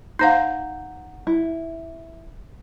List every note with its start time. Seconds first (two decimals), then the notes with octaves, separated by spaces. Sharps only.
0.19 D#4 C5 F5 F#5 A#5 G6
1.27 E4